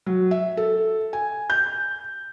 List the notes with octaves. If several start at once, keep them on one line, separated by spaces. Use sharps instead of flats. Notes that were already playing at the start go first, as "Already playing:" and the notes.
F#3
E5
A4
G#5
G6